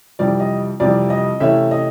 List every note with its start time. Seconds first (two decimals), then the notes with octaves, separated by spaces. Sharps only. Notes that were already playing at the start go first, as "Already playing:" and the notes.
0.19 F2 C3 E3 G3 D5
0.40 D#5
0.80 F2 C3 E3 G3 D5
1.10 D#5
1.40 C3 E3 A3 C#4 E4 E5
1.71 D#5